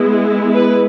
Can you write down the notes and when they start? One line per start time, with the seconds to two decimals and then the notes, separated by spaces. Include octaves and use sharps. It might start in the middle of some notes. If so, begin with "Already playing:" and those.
Already playing: G#3 B3 E4
0.53 B4